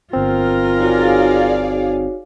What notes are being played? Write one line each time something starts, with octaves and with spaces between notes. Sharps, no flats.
G1 C4 F4 A#4
D#4 F#4 G#4 C#5 D5 F5